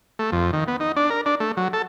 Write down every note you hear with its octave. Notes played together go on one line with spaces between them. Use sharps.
A3
F2
D#3
B3
D#4
D4
A#4
D4
A3
F#3
A4